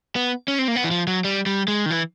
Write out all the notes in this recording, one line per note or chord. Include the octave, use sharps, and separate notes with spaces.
B3
C#4
C4
A#3
B3
E3
F3
F#3
G3
G3
G#3
D#3
E3